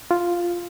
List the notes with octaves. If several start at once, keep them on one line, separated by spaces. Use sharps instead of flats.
F4